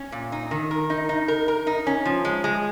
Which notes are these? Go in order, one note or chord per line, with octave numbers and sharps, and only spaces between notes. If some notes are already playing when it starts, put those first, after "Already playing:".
Already playing: C#4
A#2
D#4
D#3
A#4
D#4
D#4
A#4
A#4
D#4
C#4
F3
G#3
G#3